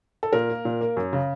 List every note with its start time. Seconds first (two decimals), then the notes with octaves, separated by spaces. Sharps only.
0.23 A4
0.33 A#2 A#4
0.49 A#3
0.65 A#2
0.81 A#3
0.97 F#2
1.13 C#3